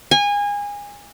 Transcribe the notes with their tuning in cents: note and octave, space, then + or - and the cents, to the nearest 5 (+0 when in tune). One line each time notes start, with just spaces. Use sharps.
G#5 -25